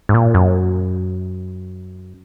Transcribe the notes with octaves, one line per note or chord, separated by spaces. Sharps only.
G#2
A#2
F#2